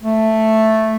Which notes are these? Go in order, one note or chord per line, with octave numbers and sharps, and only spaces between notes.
A3